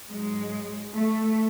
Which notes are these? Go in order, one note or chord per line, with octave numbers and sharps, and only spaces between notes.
G#2 F#3 G#3
A3